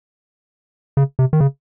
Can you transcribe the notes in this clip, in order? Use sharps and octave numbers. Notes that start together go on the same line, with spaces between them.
C#3
C3
D#3
C#3